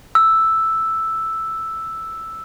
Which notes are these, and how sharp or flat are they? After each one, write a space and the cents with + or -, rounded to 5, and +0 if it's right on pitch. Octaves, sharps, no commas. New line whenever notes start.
E6 +0